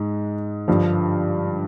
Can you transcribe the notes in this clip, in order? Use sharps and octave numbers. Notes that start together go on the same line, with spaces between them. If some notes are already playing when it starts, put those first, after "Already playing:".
Already playing: G#2 G#3
G2 D3 F3